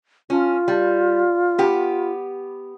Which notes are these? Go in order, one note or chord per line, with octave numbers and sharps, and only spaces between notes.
C#4 F4
G3
B3 G4